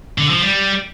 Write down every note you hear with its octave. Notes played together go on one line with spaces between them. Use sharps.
D3
F3
G3